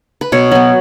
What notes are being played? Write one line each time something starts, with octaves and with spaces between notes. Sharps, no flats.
B4
B2 C#5
F#3 B3